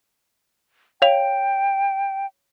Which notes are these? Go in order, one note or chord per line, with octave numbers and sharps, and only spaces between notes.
C#5 F5 G5 F7